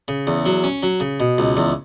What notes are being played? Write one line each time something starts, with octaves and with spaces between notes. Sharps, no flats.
C#3
E2
F#3
C#4
F#3
C#3
B2
C#2
E2